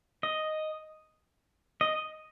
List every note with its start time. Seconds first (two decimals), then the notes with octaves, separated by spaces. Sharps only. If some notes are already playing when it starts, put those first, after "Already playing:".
0.23 D#5
1.81 D#5